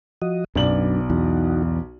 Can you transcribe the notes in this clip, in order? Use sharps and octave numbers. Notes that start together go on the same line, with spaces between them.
F3 F#4 D#5
B1 F#2 B3 D4 D5 F#7
E2 D#4 F#4